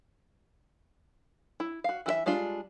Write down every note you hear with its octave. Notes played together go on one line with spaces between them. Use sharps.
E4
F#4 F5
E3 F#4 E5
G3 G#3 D4 F4